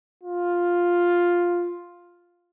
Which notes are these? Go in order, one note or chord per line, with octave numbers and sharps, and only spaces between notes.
F4